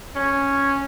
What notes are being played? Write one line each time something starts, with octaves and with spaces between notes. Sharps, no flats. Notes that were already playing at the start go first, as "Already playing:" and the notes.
C#4